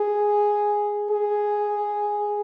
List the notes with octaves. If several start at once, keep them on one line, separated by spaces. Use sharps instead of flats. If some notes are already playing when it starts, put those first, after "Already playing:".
Already playing: G#4
G#4